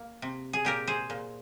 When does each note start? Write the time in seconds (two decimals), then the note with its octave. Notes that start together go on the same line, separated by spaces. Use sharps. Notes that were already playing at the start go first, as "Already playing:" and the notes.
Already playing: A#3
0.22 C3
0.53 G#4
0.65 A#2 G4 A#4
0.87 G#4 C5
1.10 A#2